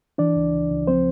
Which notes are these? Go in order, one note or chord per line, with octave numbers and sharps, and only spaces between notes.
E3 D4 D5
C#2
C#2
C#2
F3 C4 C5